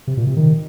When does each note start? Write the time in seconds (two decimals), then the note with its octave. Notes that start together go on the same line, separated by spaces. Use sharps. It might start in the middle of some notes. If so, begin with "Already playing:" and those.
0.07 C3
0.17 A#2
0.27 C3
0.37 D#3